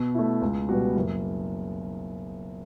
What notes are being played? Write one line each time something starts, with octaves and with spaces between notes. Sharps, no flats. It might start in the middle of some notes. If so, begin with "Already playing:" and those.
Already playing: B2
A3 E4
C#2
B2 G3 B3 F#4
F#1